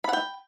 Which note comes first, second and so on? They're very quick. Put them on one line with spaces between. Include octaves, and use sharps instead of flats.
B5 F#5 G5